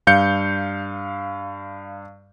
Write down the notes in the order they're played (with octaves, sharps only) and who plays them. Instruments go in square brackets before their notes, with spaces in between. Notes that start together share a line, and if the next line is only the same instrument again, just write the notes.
[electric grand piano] G2 F5 G6 C#7